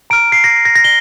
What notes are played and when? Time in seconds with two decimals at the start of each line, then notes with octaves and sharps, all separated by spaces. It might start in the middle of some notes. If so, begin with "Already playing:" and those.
0.10 A#5 F6 D7
0.32 C7
0.44 A#6
0.65 A#6
0.75 A#6
0.84 G7